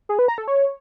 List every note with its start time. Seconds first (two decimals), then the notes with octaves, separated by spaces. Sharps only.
0.09 G#4
0.19 B4
0.28 A#5
0.38 A4
0.48 C#5